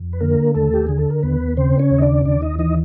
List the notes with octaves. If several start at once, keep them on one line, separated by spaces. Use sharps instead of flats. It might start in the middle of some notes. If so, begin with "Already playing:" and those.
Already playing: F2
B4
D3 A#3 A#4
D#2 A3 A4
G4
D3 G#4
A4
A#4
D#2 B3 B4
C#3 C4 C5
C#4 C#5
D#2
D#5
D4 D5
D#2 D4 D5
D#4 D#5
E3 D#4 D#5